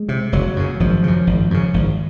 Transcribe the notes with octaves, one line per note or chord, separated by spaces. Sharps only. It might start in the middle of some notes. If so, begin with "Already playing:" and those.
Already playing: G#3
C3
F#1 F#3
F#2 C#3
G#1 F3
F#2 C#3
G#1
F#2 C#3
G#1